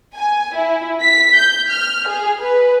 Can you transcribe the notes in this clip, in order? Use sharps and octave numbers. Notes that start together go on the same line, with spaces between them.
G#5
E4
B6
G6
F6
G#4
B4